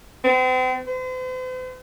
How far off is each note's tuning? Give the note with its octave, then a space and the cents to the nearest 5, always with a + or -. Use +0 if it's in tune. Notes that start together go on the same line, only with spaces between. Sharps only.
C4 -40
C5 -45